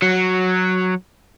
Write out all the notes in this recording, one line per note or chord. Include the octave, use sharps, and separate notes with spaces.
F#3